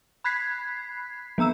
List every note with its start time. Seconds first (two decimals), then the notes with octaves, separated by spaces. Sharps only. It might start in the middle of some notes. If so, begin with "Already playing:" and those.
0.24 B5 F#6 G#6 B6 C7
1.38 F3 B3 A#5 E6 E7